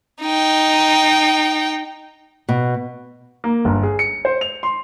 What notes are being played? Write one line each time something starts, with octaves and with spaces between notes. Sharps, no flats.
D#4 G5
B2
A#3
G1
G#4
C#7
C5
F7
C6